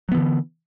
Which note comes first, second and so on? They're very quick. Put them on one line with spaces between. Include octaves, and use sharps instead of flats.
F#3 B3 E3 D3